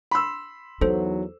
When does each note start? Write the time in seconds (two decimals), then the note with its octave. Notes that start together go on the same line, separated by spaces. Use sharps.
0.11 B5 C6 E6
0.81 E2 F#3 D#4 A4 C5